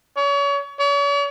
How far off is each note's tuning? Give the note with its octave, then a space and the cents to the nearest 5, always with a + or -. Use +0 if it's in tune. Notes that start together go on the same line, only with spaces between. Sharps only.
C#5 +35
C#5 +45